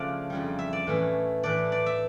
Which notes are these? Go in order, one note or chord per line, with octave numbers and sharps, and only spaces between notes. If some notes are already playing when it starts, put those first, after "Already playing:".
Already playing: C#3 F3 A3 D4 D5 F5
F2 C#3 G3
E5
D5
A2 E3 A3 C#4
A2 E3 A3 D4 D5
D5
E5